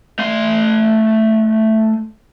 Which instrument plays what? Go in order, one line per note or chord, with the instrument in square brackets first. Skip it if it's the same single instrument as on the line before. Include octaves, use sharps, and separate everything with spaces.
[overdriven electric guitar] A3 C6